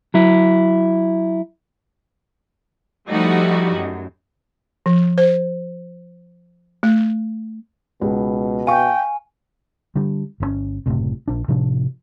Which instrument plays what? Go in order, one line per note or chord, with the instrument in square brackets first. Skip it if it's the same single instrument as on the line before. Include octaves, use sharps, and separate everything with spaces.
[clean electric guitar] F#3 E4
[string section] F3 G3 A3 D#4 E4 F#4
F#2
[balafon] F3
C5
A3
[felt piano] C#2 [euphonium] B2
[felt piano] F5 C#6 [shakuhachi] G5 [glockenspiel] G#5
[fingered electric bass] D3 G3
G1 D3 C#4
F#1 B1 A2 C3
A#1 D4
A2 C3 F3 D4